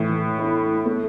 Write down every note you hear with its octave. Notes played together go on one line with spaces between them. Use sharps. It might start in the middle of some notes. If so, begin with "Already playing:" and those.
Already playing: A2 E3
E4
A3